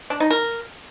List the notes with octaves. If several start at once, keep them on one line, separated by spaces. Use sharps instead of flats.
D4
D#4
A#4